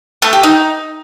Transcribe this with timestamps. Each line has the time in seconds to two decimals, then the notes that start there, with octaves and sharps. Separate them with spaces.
0.22 A3
0.33 G4
0.43 D#4